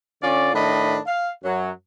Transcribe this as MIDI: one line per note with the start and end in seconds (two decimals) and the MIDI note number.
0.22 0.51 50
0.22 0.51 61
0.22 0.51 65
0.22 0.51 74
0.53 0.98 45
0.53 0.98 51
0.53 0.98 62
0.53 0.98 75
0.53 0.98 83
1.06 1.29 77
1.43 1.70 42
1.43 1.70 54